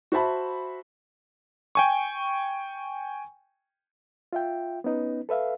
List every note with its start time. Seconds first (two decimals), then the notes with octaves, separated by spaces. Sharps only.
0.12 F#4 C5 E5 A5 B5
1.75 G5 G#5 C#6
4.33 F4 E5 G5
4.84 B3 C#4 D#4 B4
5.29 A4 B4 E5 F5